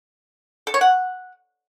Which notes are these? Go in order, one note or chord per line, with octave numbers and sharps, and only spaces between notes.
A4
C#5
F#5